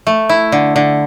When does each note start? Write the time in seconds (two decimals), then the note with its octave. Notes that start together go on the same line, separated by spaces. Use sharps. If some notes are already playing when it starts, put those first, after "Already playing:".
0.07 A3
0.29 E4
0.52 D3
0.76 D3